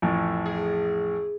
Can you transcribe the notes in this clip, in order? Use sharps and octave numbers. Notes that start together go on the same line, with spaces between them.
A1 F2 A2
G#4